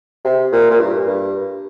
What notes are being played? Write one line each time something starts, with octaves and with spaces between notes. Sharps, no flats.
C3
A#2
A#2
G2
G2